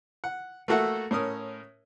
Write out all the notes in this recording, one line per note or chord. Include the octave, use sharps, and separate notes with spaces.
F#5
A3 A#3 F#4 A4 E5 F#5
A2 C#4 A#4 D#6